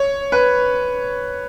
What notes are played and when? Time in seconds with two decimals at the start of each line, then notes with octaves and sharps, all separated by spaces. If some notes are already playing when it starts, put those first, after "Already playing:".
Already playing: C#5
0.32 B4